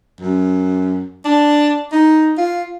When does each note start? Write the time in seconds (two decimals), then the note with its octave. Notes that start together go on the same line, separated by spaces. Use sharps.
0.20 F#2
1.25 D4
1.92 D#4
2.38 F4